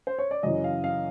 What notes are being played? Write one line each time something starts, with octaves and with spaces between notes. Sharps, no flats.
C5
C#5
D5
F#2 C#3 E3 D#5
F5
F5